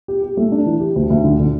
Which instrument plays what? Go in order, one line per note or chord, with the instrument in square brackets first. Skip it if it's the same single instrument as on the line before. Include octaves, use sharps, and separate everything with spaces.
[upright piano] G4
G4
A3
D4
E3
G4
D2
D2
D3
D3